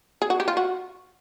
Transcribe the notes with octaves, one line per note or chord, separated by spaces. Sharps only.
G#4
F#4
G4
F4
F#4